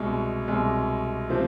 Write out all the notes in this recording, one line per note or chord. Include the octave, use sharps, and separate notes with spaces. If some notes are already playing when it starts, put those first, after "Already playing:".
Already playing: C2 B2 G#3
C2 B2 G#3
C3 F3 A3 C4